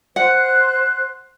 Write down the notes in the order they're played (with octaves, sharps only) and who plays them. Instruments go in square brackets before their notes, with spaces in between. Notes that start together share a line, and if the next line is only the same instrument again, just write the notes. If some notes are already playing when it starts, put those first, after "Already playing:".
[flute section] C5 F#6 [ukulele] F#5